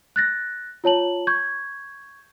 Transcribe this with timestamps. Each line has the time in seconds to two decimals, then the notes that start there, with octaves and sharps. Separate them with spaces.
0.16 F#6 A6 A#6
0.84 F4 C#5 A5 F#7
1.27 C#6 G6 G#6